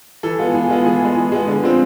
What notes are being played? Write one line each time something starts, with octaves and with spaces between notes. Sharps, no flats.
E3 A4
G#3 B3 F4
E3 G#4
G#3 B3 F4
E3 G#4
G#3 B3
E3
G#3 B3
D3
F3 G#3 C4